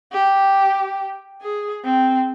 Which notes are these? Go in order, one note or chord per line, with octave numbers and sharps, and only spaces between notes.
G4
G#4
C4